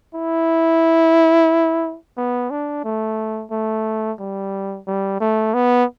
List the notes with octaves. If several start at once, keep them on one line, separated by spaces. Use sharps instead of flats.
E4
B3
D4
A3
A3
G3
G3
A3
B3